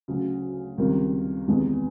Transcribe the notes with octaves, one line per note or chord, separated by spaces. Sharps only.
D2 C#3 F#3
C#2 C3 D#3 G3 A#3
E2 C3 D#3 G#3 B3